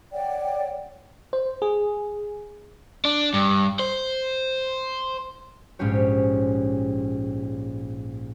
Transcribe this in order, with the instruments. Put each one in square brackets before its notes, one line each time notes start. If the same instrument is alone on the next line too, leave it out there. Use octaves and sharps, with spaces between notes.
[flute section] C#5 D5 F#5 G5
[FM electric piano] C5
G#4
[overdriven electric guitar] D4
G2
C5
[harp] A#1 G#2 G#3 C#4 G4 C#5